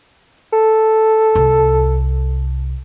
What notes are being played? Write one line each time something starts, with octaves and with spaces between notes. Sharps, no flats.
A4
C2